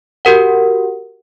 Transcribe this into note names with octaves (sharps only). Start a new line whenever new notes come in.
F#4 G4 A#4 F#5